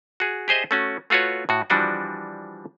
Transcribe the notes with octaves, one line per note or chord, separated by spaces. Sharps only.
F#4 G#4
G4 G#4 C5 D#5 E5
A3 C#4 F#4
A3 F4 F#4 B4 C#5
A2 F#4
E3 F3 G3 D4 F#4 D#5